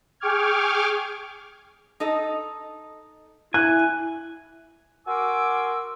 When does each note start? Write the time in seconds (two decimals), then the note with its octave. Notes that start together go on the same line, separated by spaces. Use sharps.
0.20 G#4 G5 C#6 D6 F6 G#6
2.00 D#4 A4 D#5
3.54 E4 G#5 F#6
5.06 F#4 A#4 G#5 C6 D6 E6